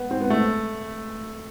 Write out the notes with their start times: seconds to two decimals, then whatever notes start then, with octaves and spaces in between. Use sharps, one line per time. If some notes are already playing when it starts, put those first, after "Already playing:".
Already playing: B3
0.11 C4
0.21 B3
0.30 A3